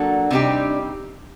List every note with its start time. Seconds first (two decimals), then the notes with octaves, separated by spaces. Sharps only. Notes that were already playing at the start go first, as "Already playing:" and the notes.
Already playing: F#3 A#3 D4 F#4 A4
0.30 C3 G3 C4 D#4 G4